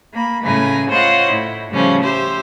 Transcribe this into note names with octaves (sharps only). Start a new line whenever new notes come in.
A#3 B5
A2 C#3 G#3 B4 G#5 A#5
F4 C5 C#5 D#5 F#5
A2 E4
A2 C#3 F3 G3 C#4
G4 C5 E5